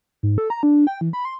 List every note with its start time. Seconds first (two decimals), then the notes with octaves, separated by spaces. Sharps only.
0.23 G#2
0.38 A4
0.50 A#5
0.63 D4
0.87 G5
1.01 E3
1.13 B5
1.25 C6